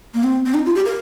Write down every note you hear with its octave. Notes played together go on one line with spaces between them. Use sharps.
A#3
C4
C4
D#4
F4
G4
A#4